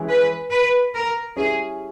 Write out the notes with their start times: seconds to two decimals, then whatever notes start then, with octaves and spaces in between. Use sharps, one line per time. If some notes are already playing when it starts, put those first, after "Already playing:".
Already playing: E3 G#3 C#4 E4
0.09 B4
0.51 B4
0.94 A#4
1.36 G3 C#4 E4 G#4